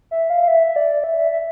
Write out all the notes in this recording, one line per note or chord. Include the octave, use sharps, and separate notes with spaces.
E5
F5
F5
E5
D5
E5
E5
E5